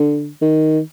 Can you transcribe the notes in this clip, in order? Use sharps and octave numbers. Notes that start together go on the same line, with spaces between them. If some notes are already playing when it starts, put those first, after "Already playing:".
Already playing: D3
D#3